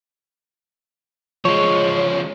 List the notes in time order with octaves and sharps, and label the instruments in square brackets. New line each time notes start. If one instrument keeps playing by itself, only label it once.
[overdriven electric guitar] F3 G#3 [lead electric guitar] C#5